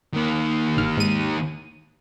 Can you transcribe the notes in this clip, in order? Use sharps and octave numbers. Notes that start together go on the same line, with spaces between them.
D#3 A#3
G1 G#2 F6
G#2 D#7